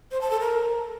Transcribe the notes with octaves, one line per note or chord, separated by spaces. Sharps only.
C5
A5
A4
A#4